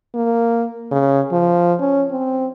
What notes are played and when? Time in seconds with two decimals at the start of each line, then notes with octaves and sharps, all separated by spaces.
0.15 A#3
0.92 C#3
1.32 F3
1.80 C#4
2.11 C4